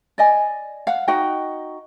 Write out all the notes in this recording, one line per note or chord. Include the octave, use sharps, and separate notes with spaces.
D5 D#5 G#5
F5 F#5
D#4 F#4 D#5 G5